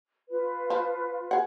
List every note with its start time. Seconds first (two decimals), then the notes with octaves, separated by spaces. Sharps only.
0.30 F4 B4
0.70 F3
1.31 G#4 F#5